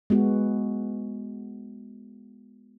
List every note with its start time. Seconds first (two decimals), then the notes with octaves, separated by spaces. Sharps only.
0.10 G#3 B3 F#4